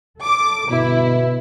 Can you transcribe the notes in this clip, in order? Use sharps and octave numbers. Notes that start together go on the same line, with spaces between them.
A4 D6
G1 B2 E4